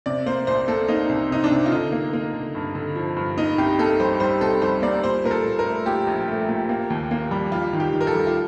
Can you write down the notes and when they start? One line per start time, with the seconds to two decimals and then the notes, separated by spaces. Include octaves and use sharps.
0.06 C3 D5
0.26 A#3 C5
0.47 C2 C5
0.68 A#3 A4
0.88 A#3 D#4
1.09 C2
1.30 C3 D#4
1.44 D4
1.51 C3
1.66 F4
1.72 D3 D#4
1.92 A#3
2.13 A#3
2.34 D3
2.55 G2
2.75 D3
2.96 F3
3.17 G2
3.37 A#3 D#4
3.58 C2 G4
3.79 A#3 A4
4.00 G3 C5
4.20 G3 C5
4.41 C2 A4
4.62 G3 C5
4.82 A#3 D5
5.03 A#2 C5
5.24 A#2 A#4
5.31 A4
5.45 A#2
5.59 A#4
5.66 A3
5.86 A#2 G4
6.07 A#1
6.28 A3
6.49 A#2
6.69 A#3
6.90 D#2
7.11 A#3
7.31 G3
7.52 G3 F4
7.73 D#3
7.80 G4
7.93 D#3
8.01 A#4
8.07 A4
8.14 G3
8.27 F4